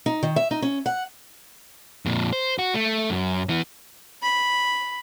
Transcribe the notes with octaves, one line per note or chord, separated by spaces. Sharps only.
D#4
D#3
E5
D#4
C#4
F#5
F2 A#2
C5
F#4
A3
F#2
E3 B3
B5